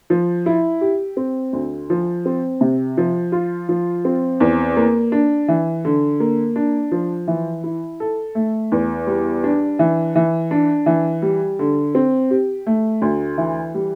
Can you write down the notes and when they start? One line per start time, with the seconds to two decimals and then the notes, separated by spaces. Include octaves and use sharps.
0.10 F3
0.46 E4
0.81 G4
1.17 C4
1.53 D2
1.90 F3
2.26 C4
2.61 C3
2.97 F3
3.32 F4
3.69 F3
4.05 C4
4.40 E2
4.76 A#3
5.12 D4
5.48 E3
5.85 D3
6.20 A#3
6.56 D4
6.92 F3
7.28 E3
7.64 E4
8.00 A4
8.35 A3
8.72 E2
9.07 G3
9.44 D4
9.79 E3
10.15 E3
10.51 D4
10.86 E3
11.22 G3
11.59 D3
11.95 C4
12.31 G4
12.67 A3
13.02 D2
13.38 E3
13.74 G3